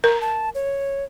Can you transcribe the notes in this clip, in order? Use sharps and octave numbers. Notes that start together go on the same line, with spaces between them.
A#4 A#5
A5
C#5